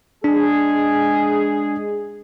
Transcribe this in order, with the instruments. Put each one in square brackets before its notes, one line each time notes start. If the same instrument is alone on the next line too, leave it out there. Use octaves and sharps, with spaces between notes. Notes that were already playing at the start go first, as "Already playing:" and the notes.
[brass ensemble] G#3 G#4 [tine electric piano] D4